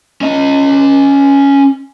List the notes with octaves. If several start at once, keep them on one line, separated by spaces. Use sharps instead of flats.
C#4 D#5